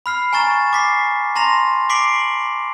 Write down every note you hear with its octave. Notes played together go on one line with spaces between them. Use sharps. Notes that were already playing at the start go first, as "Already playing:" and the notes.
B5 F6 C7
G#5 A#5 C#6 A6 E7
D6 B6 C7
A5 A#5 C6 A#6 F7
D6 B6 C7 D7 F#7